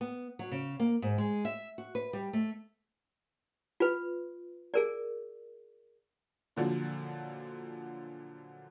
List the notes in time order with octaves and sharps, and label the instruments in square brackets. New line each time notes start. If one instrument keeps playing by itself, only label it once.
[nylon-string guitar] B3
F#3
C#3
A#3
G#2
G#3
E5
F#4
B4
G3
A3
[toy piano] F4 B4
G#4 A#4 D5
[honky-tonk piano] A#2 D3 F3 F#3